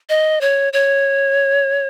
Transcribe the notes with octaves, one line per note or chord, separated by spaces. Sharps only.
D#5
C#5
C#5